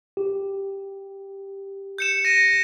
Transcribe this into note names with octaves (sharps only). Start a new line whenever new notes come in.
G4
G6 C#7 E7
A#6 D#7